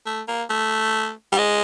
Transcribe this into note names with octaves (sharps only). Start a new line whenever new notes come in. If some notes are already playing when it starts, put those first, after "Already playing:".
A3
A#3
A3
G3
G#3